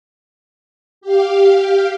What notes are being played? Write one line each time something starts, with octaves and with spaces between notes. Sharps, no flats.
G4 F5